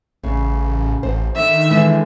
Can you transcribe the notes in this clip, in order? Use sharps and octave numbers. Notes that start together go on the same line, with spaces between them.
A1 C#3
A1 C5
D3 D#3 E5
D3 E3 G#3